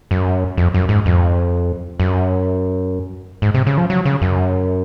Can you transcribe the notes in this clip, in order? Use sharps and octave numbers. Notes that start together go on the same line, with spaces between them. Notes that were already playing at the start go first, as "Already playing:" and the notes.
F#2
F2
F#2
G#2
F2
F#2
G#2
C3
C#3
F3
F#3
C#3
F#2